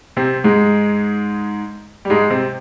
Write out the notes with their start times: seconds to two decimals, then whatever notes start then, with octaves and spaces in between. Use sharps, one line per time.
0.17 C3 C4
0.44 G#2 G#3
2.05 G3
2.10 G#2 G#3
2.30 C3 C4